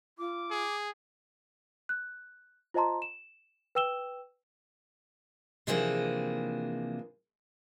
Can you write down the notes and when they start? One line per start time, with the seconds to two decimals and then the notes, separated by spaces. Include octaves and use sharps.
0.18 F4 D6
0.51 G#4
1.89 F#6
2.74 F4 C5 D#5 A5 A#5 C6
3.02 E7
3.75 B4 G5 E6 E7 G7
5.67 C3 E3 F3 A#3 D4 G#4